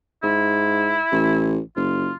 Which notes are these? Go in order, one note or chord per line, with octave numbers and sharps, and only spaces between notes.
G#2 E4
A1
F#1 F4